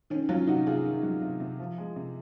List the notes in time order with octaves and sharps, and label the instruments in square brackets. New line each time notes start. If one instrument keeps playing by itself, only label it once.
[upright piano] D#3 C#4
F#3 C#4 F4
C3 D#4 F#4
C3 F4 G#4
D#3
F#3
C3
C3
F3
G#3
C3